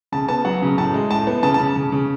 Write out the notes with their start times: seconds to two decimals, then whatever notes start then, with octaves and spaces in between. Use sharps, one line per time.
0.12 C#3 A5
0.29 B3 A5
0.45 F#3 F#5
0.62 C#3
0.78 A2 A5
0.94 G#3
1.11 A2 A5
1.27 B3
1.43 C#3 A5
1.54 A5
1.60 C#3
1.76 C#3
1.92 C#3